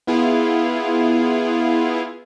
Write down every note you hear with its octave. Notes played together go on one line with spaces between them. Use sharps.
B3 E4 F4 G#4